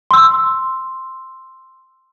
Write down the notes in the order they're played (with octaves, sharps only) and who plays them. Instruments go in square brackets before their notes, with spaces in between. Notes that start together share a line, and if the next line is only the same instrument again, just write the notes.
[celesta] C6 E6